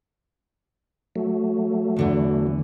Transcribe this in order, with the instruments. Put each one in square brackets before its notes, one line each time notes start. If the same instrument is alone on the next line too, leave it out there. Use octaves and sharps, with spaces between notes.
[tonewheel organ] F#3 A3
[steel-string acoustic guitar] E2 D3 E3